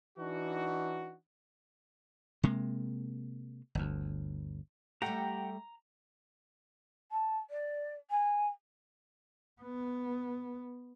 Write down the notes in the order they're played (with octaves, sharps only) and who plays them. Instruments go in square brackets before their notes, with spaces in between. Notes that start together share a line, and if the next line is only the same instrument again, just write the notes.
[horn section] E3 D4 D#4 F#4
[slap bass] C3 G#3 A#3
G1 D2
[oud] G3 A3 [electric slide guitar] G4 F#5 G5 [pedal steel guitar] A#5
[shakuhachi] A5
D5
G#5
[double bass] B3